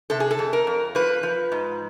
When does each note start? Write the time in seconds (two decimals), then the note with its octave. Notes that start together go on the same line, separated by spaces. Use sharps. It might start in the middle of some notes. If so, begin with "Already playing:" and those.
0.10 C3 A4
0.20 G#4
0.31 A4
0.39 F2
0.53 A#4
0.67 F2
0.95 F3 B4
1.23 F3
1.52 G#2